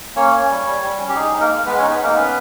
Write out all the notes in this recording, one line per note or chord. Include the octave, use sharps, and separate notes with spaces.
A#3 C#4 C#5
C#4
G3
G3
G3
C#4
G4
D#4 G#4
D#4
A#3 A#4
G#3
G#3 B3 B4
C#4 D#4 C#5
B3 B4
D#4
A#3 A#4
B3 C#4 B4